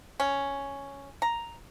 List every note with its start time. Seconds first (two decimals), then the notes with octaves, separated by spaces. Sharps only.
0.20 C#4
1.22 A#5